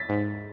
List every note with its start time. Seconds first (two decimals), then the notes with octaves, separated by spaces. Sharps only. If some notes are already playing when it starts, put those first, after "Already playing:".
Already playing: A6 B6
0.09 G#2